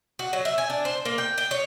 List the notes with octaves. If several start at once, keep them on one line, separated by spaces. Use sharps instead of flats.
F#4
F#3
E5
G#5
D4
C5
A#3
G5
G5
C#5